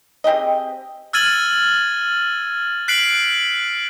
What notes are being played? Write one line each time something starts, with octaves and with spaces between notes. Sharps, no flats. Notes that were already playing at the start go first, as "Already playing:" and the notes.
C4 G4 G#4 D#5
E6 F6 G#6 A6 D#7 F#7
F#6 B6 C7 D7 F#7